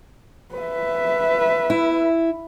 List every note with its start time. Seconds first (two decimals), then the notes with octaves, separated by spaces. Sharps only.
0.55 B4 E5
1.70 E4